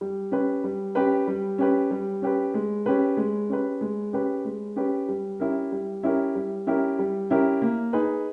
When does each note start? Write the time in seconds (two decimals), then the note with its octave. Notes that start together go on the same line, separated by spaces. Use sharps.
0.01 G3
0.32 C#4 G4 B4
0.64 G3
0.95 C#4 G4 B4
1.27 G3
1.58 C#4 G4 B4
1.91 G3
2.22 C#4 G4 B4
2.54 G#3
2.86 C#4 G4 B4
3.17 G#3
3.49 C#4 G4 B4
3.81 G#3
4.13 C#4 G4 B4
4.45 G#3
4.76 C#4 G4 B4
5.09 G3
5.40 C#4 E4 G4 A#4
5.72 G3
6.03 C#4 E4 G4 A#4
6.35 G3
6.67 C#4 E4 G4 A#4
6.99 G3
7.30 C#4 E4 G4 A#4
7.62 A#3
7.93 D#4 G#4 B4